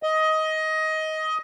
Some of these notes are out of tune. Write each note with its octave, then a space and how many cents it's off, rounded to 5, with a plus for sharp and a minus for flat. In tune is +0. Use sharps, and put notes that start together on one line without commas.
D#5 +15